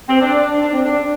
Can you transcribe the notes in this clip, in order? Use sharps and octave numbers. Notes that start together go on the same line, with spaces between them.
C4
D4
D4
C4
D4